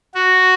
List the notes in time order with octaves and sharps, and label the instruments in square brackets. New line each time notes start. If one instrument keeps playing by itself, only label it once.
[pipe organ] F#4